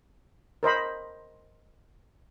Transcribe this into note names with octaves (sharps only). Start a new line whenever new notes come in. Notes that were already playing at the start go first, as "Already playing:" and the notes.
A#4 C5 D#5 B5